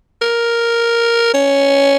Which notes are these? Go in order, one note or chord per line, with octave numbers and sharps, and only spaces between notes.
A#4
C#4